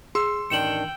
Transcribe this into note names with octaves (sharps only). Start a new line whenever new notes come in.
G#4 C6 E6
A1 D#3 D4 G5 C#7 E7 F#7